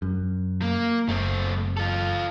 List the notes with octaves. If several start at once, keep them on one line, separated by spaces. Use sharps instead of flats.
F#2
A#3
F#1 A3 C4
F4 A4